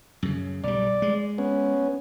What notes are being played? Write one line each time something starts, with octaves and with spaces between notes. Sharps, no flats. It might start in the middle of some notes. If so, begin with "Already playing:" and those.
F#2 C#3
B1 G3 D5
G#3
B3 C#4